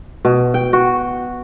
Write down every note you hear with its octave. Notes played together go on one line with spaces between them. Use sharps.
B2
G5
F#4